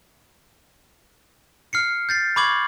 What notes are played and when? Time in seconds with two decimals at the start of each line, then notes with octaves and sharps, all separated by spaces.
1.73 F6 C7 C#7
2.09 G6 A6 C7
2.36 B5 C#6 D6 G#6 F#7